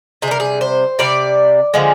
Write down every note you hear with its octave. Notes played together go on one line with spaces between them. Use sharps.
C3 G#4
G3 A#4
G#4
C5
C3 G3 D5
D3 F3 G#3